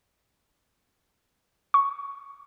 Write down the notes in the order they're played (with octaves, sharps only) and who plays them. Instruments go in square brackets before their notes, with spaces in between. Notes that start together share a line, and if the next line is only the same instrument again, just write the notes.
[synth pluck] C#6